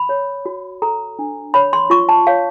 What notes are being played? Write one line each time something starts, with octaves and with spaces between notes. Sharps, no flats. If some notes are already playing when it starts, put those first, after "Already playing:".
Already playing: B5
C#5
F#4
A4 A#5
D4
C#5 B5
C6
F4 C#6
A5
C#5 F5